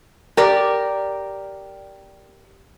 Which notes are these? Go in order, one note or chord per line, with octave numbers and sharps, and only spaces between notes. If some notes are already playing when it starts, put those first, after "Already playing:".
G4 A#4 D5